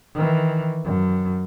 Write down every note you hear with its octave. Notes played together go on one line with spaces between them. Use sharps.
D#3 E3
F#2